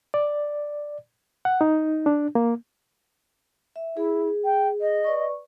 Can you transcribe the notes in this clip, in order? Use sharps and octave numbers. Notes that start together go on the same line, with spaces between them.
D5
F#5
D#4
D4
A#3
E5
E4 G#4
G5
D#5
B4 D5 C#6